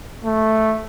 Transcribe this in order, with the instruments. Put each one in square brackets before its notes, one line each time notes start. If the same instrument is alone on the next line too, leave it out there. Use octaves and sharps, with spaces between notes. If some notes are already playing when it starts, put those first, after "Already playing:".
[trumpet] A3